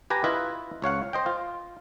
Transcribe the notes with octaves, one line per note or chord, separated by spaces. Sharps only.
G4 B4 G#5 A#5
E4 F4 B4 D#5 E5
C#2 C#5 F5 F#5
C5 D#5 G5
F4